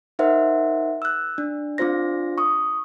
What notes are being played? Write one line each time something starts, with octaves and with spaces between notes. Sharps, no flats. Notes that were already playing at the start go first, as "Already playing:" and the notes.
D#4 A#4 C5 E5 F#5
E6 F#6
D4
C4 D4 F4 C5 A#6
C#6 D#6